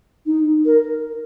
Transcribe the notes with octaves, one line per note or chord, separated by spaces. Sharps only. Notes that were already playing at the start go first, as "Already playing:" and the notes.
D#4
A#4